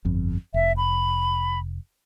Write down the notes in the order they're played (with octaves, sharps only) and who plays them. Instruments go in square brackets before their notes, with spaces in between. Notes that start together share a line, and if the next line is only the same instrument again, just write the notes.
[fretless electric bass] G1 F2
[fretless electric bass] F1 [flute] E5
[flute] B5